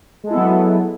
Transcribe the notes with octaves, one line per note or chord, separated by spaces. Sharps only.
F#3 G#3 B3 E4 A4